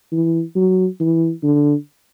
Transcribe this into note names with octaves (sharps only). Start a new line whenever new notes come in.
E3
F#3
E3
D3